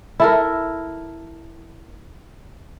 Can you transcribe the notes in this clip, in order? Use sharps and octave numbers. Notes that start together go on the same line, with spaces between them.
E4 A4 A#4